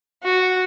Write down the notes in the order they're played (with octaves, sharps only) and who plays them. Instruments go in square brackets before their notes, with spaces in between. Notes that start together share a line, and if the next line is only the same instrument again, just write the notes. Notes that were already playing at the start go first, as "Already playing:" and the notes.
[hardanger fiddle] F#4